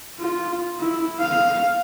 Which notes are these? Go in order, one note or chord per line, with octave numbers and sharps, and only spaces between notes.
F4
E4
F5